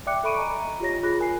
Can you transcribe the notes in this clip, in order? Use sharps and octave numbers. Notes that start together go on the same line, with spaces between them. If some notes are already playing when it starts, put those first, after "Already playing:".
D5 E5 G5 D6 F#6 C#7
A4 E5 B5 C#6 D7 D#7
D#5 G#5 A#5
F4 G4 C#5 A#6
F4 G#4 B5 F#6 A#6
A#4 G#5 C7